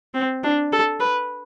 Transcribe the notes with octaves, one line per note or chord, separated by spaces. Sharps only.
C4
D4
A4
B4